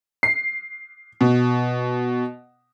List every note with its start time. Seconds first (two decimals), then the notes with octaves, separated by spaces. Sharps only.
0.23 C7
1.21 B2